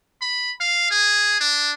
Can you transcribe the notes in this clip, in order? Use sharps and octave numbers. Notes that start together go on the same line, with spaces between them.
B5
F5
G#4
D4